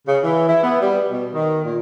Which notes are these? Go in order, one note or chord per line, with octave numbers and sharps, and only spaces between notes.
C#3
E3
E4
B3
G3
B2
D#3
A#2